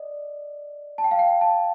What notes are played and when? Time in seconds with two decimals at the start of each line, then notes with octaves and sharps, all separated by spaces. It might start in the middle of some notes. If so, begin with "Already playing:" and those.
Already playing: D5 D#5
0.98 A5
1.04 G5
1.11 F5
1.19 G5
1.41 A5